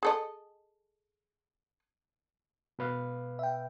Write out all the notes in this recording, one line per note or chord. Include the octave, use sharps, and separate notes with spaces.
G#4 A4 D#5
B2 B4 F5
E5 G5